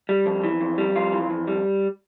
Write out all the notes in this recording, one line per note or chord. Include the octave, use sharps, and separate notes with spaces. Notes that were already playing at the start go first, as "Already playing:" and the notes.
G3
F2
E3
F2
G3
F2 F4
E3
F2
G3